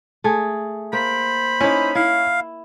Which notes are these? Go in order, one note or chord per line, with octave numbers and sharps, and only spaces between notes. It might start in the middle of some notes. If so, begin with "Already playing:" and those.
A3 G#4
A#3 C5 B5
C#4 D#4 E4
E4 F5